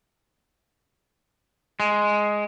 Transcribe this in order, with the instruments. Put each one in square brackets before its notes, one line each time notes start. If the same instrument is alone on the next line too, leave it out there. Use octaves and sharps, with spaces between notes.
[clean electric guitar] G#3